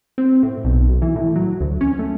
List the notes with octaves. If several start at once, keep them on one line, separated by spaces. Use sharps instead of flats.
C4
A2
B1
B1
E3
A2
F#3
D2
C#4
A3